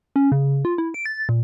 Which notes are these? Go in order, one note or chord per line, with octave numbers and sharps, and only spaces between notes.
C#4
C#3
F4
E4
D7
A6
A#2